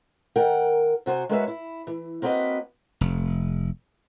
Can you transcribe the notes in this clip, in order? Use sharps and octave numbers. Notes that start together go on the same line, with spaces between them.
D#3 A#4 F#5 G5
C3 F#4 C5 G#5
G#3 A#3 F#4 B4 C#5 E5
E4
E3
A#3 C4 F#4 A4 B4 D#5
F1